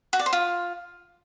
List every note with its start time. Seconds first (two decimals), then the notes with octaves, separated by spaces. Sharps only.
0.13 F#4
0.19 D5
0.26 C5
0.33 F4